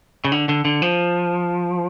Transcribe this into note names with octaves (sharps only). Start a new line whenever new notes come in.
C#3
D3
D3
D3
F3